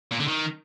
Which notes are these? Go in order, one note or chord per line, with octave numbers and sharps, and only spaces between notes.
A#2
D3
D#3